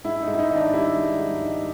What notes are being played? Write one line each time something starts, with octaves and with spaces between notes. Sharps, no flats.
G#2 E4
D#4
G#2
E4
D#4
D#3 D#4
D4
G3 E4
G#2
G#2
D#3